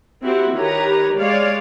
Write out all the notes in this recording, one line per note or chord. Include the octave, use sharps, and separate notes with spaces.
C4 E4 F#4 G4
D#3 G4 B4 C#5 A#5
G#3 C#5 D5 F5